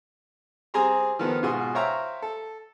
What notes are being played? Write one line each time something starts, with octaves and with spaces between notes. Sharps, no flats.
G3 C4 G#4 G#5 A#5 C6
D#3 F3 B3 A4
G#2 B2 F4 G#4 C6
C5 C#5 E5 F5 G5 A#5
A4